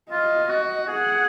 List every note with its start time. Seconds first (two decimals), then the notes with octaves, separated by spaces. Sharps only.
0.11 F4 D#5
0.49 F#4
0.88 G#4 F#5